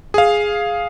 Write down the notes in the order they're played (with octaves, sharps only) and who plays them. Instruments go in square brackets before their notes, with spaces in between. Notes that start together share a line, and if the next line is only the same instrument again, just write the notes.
[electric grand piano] G#4 F5